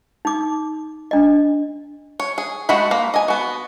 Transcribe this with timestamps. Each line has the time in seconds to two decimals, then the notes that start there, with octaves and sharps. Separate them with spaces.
0.25 D#4 D6
1.11 D4 D#5
2.20 C#5
2.38 G#4
2.69 G#3 A3 F#4 F#5 B5
2.91 A#3
3.14 D#5 G#5
3.28 B3 F#4